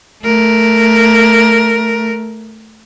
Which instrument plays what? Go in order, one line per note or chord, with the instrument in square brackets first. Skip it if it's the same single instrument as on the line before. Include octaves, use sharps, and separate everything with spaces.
[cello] A3 A#4